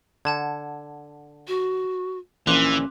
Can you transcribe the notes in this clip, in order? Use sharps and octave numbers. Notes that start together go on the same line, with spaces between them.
D3 F#5 A5 G#6
F#4
A#1 A#2 E3 C#4 C6 D6 F#6